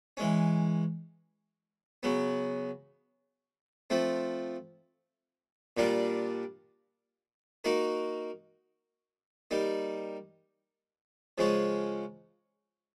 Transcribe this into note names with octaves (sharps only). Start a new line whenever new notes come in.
E3 G#3 C#4
C#3 F#3 B3
F3 A3 C4
A#2 G3 A#3 D4 F4
A#3 D#4 F#4 A#4
G3 A#3 D#4
C#3 F3 G#3 C#4 F4